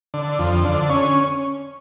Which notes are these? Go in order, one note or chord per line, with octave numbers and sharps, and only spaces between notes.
D3
F2
D3
C#4